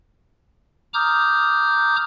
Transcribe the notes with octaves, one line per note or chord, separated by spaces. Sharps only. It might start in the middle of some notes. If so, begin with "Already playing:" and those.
A#5 D6 D#6 F6 G6